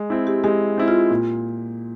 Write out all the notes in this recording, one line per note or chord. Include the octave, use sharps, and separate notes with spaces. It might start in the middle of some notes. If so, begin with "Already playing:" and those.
Already playing: G#3
C4 E4
G4
G#3 G4
C4 E4
F4
A#2